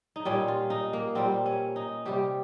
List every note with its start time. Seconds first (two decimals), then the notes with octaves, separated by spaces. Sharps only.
0.16 D#4
0.25 A#2 G3 C#4
0.48 F4
0.70 D#4
0.93 A#3
1.15 A#2 G3 C4
1.46 C#4
1.76 D#4
2.05 C3 G3 G4